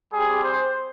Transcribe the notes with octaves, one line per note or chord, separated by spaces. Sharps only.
G3 C4 G4 G#4
C5